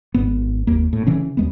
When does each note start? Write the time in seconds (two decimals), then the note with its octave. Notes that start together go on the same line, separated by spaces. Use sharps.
0.14 G#1 G#2 B3
0.67 F#1 D#2 A#3
0.93 A2
1.07 C#3 E3 C#4
1.37 D#2 G#3 B3